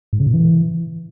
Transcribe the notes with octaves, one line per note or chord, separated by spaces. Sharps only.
G#2
C#3
A#2
E3